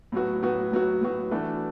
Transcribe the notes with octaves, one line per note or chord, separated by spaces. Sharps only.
A2 F#3 B3 F#4
A2 F#3 B3 F#4
A2 F#3 B3 F#4
A2 F#3 B3 F#4
E3 A3 D4 F#4